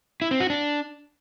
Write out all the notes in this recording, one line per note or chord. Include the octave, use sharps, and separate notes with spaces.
E4
C4
F#4
D4